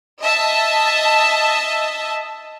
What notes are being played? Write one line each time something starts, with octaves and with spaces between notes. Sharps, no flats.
D#5 E5 A5